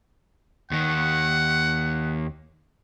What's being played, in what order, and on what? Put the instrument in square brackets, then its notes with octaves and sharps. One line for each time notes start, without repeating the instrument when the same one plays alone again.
[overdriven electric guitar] D#2 D#3 [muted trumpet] F#5